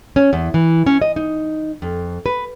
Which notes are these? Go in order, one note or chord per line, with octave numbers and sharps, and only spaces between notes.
C#4
E2
E3
C#4
D#5
D#4
F2
B4